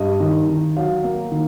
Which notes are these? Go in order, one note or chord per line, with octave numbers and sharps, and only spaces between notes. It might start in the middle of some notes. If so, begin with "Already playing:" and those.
Already playing: G2 D#5
D#3
D#3
F#3 F5
A#3
D#3